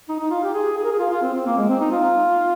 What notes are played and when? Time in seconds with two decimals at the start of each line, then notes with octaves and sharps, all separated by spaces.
0.09 D#4
0.20 D#4
0.30 F4
0.43 G4
0.54 G#4
0.77 G#4
0.84 A#4
0.92 G#4
0.99 F4
1.11 F4
1.22 C4
1.34 C4
1.46 A#3
1.57 G#3
1.69 C4
1.80 D#4
1.91 F4